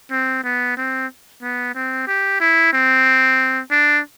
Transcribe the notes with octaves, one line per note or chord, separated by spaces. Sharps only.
C4
B3
C4
B3
C4
G4
E4
C4
D4